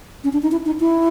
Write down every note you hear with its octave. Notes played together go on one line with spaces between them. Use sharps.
C#4
D4
D#4
E4
D#4
E4